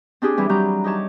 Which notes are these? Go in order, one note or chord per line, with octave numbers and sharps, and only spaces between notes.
C4 D4 G4 G#4
E3 G3 C4
E3 F#3 G3 C4 A#5 G6
D#4 G4 C#5 A5